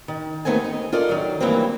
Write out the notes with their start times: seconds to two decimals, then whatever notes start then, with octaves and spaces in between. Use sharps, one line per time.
0.08 D#3
0.45 D#2 D#3 A3 B3 C4 G#5
0.64 D#4
0.92 F4 A4 A#4 D5 D#5
1.09 D#3 F#3
1.40 D2 E3 F#3 G3 A#3 C4